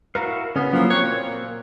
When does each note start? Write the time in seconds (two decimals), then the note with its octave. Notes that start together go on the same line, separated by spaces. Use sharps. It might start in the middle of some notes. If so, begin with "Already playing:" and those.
0.15 E4 F#4 A#4 F5
0.56 C#3 B3 C#4
0.73 A2 F3 F#3 A#3
0.90 A#3 C4 C#5 F#6
1.02 A#2